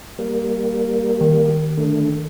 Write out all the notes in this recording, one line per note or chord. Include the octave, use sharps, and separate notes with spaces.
G3 A#3
D#3
D3 A3